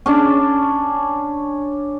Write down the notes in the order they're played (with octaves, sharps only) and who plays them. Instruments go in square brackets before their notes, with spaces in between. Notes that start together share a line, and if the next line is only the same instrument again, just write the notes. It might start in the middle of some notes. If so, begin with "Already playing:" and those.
[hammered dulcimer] C#4 D4